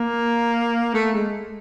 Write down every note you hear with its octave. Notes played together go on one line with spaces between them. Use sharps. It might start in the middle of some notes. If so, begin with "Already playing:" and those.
Already playing: A#3
A3
G#3